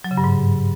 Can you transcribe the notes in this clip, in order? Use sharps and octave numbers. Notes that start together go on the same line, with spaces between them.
F#3
C#3
G2
G#2